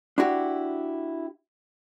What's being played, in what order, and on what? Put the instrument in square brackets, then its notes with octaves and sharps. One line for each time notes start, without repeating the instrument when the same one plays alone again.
[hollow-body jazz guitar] D4 E4 F#4 G4